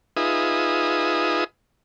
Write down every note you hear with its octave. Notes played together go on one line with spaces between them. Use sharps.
D#4 F4 G#4 B4 E5 D#6